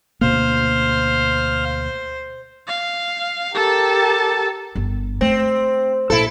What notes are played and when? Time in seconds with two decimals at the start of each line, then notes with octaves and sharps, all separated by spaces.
0.21 D2 B2 A#3 C5 F5
2.67 F5
3.55 G4 A4 A#4 A5
4.75 G1
5.21 A3 C4
6.10 A#1 E4 A4